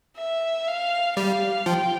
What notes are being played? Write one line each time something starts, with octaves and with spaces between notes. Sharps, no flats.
E5
F5
G3 F5
F3 G5